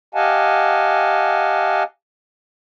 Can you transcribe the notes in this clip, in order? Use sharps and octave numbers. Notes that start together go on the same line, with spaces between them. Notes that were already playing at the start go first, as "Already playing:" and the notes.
G4 D#5 F5 F#5 G#5 A5